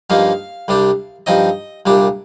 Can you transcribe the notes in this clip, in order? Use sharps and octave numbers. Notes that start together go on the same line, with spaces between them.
G2 F3 A#3 D#4 F5
C2 C3 G3 D4
G2 F3 C4 D#4 D#5
C2 A#2 G3 D4